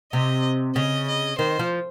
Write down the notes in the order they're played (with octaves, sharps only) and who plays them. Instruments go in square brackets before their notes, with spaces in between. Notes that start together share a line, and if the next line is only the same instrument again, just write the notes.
[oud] C3 [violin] D#5
[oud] C#3 [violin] D#5
[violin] D#5
[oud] D#3 [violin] C5
[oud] F3